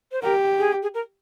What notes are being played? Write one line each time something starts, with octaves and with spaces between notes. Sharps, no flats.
C5
G4 A#4
G#4
G#4
A#4